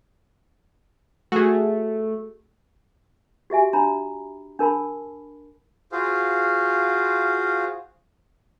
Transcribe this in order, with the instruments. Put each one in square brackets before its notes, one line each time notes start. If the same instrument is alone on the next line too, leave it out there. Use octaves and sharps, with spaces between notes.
[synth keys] A3 [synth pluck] F#4 G#4
[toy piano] F#4 G4 E5 G#5
D4 A#5 B5
D4 A#4 A5 B5
[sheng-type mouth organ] F4 F#4 G#4 C5 F5